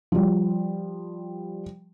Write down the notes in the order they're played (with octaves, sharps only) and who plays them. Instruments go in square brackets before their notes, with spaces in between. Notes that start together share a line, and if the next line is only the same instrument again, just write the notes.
[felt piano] F3 G3